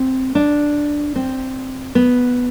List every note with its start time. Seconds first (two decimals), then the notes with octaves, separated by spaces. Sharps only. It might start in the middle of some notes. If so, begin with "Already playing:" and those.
Already playing: C4
0.35 D4
1.16 C4
1.95 B3